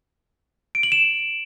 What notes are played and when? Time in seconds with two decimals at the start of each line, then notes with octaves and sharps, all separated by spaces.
0.75 D7
0.83 F#7
0.92 E7